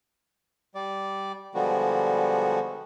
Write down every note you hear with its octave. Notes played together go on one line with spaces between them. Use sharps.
G3 D5
D3 F3 G3 G#3 B3 F#4